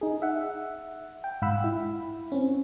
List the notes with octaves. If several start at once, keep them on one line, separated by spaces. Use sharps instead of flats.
D#4 G#4
E5 F#5
G5
G#2 F5 F#5 B5 E6
E4
C4 C#4